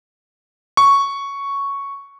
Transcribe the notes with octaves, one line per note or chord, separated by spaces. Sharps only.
C#6